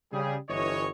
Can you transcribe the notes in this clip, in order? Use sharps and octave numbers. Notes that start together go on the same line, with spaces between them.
C#3 G3 G#4
G1 E3 C#5 D#5